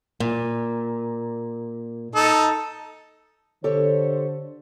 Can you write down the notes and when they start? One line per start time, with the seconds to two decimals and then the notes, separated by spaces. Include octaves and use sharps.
0.20 A#2
2.15 D#4 A4
3.64 D3 G4 A4 C5 C#5